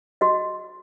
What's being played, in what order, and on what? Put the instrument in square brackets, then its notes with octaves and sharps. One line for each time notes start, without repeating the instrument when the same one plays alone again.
[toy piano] F#4 D#5